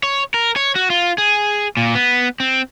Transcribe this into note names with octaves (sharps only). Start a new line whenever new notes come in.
C#5
A#4
C#5
F#4
F4
G#4
A#2
B3
C4